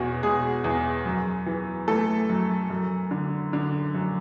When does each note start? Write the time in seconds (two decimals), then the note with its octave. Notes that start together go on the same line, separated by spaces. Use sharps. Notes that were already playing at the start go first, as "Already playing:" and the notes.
Already playing: E2 B2 C#4 F#4
0.23 B2 G#3 G#4
0.64 E2
1.05 F#2
1.46 E3
1.88 E3 A3 A4
2.29 F#2
2.70 F#2
3.11 D3
3.53 D3
3.94 F#2